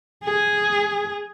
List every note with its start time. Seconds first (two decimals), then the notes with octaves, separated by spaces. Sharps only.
0.24 G#4